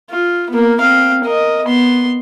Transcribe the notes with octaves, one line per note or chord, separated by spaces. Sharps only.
F4
A#3 B3
C4 F5
A#4 D#5
B3 C6